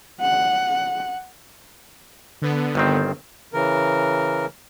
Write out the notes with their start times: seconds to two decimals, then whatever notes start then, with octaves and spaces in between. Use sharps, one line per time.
0.21 F#5
2.42 D3 B3
2.75 G1 D#3 C4
3.53 C#3 E3 A#4